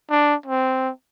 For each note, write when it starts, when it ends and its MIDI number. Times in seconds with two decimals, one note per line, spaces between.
0.10 0.35 62
0.46 0.90 60